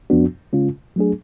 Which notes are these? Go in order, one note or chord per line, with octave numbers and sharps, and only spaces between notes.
F2 F3 B3 D4 F#4
C#3 G#3 C#4 F4
F#3 A3 D4 G#4